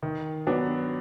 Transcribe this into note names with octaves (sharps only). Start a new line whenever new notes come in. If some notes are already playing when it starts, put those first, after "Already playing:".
D#3
F#3 B3 D4